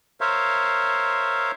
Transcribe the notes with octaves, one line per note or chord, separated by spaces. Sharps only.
A#4 C5 C#5 E5 F5